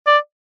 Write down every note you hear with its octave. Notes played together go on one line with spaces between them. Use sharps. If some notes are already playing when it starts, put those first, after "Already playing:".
D5